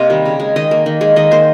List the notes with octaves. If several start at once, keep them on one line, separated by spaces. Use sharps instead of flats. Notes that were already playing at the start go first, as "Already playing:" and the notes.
Already playing: C3 A#3 C5 D#5 F5
D#3 G3
C#3
G#3
D#3 D#5
A#3
D#3
G#3
D#3 D#5
A#3 C5